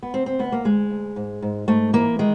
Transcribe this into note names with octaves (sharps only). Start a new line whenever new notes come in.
B3
D2 C4
C4
D2 B3
A#3
D2 G#3
D2
G#2
G#2
G#2 A3
E3 A#3
D#3 G#3